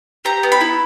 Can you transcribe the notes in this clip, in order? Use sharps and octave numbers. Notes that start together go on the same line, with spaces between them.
G4 A#5
B3
B5
E4